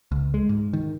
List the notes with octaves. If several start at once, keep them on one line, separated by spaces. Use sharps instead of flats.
C#2
G#3
G#2
D#3